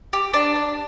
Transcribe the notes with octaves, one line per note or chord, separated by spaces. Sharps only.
G4
D4
D4